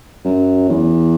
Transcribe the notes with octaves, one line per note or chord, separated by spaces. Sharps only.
F#2
E2